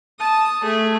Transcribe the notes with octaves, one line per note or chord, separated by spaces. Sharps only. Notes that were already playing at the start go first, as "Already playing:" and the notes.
A5 D#6
A3 G#4